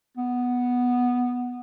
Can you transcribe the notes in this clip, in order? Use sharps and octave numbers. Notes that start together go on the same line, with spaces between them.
B3